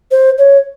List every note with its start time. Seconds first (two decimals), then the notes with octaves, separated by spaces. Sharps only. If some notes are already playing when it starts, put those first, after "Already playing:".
0.11 C5
0.38 C#5